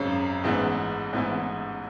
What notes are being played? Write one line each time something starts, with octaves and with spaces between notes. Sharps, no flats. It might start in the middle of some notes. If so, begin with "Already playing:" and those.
Already playing: G#1 F#2 C#3
A1 G#2 E3 B3 E4
A1 G#2 E3 B3 E4